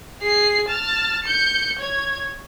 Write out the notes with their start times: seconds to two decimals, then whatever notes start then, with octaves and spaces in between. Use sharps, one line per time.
0.22 G#4 C7
0.68 A5 F6
1.24 G6 C#7
1.79 C#5 G#6